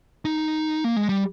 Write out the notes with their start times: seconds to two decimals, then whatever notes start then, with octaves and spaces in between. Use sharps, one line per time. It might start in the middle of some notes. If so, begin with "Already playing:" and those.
0.25 D#4
0.84 A#3
0.96 G#3
1.09 G3